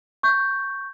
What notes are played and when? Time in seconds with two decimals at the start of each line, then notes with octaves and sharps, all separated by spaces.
0.23 C#6 G6